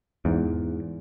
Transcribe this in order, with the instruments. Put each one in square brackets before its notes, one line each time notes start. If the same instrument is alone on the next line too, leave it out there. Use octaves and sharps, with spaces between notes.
[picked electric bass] E2 G#2